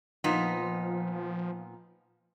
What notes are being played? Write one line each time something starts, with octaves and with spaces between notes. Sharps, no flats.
A#2 F3 B3 D#4